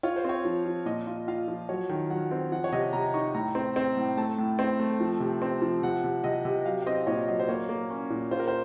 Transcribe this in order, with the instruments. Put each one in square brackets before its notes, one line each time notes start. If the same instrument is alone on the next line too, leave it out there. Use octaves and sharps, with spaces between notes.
[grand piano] F4 C#5
C5
C4 C#5
F3
F3
A#2 D#5
F4
F4 F5
F3
F#3 C#5
D#3
F#3 F#5
C4
F3 F#5
C#5
C3 D#5
C3 A#5
D#4 C#6
A2 A#5
C4
C4
A2
A3 A5
A2
C4
A3
F3
C3
C4
F3
C3 F#5
C3
C3 D#5
C3
F#3 F5
F5
C4 D#5
A#2 C#5
F#3 D#5
C5
A#3 C#5
A#3
C#4
A#2
F4 C5
A#4
C5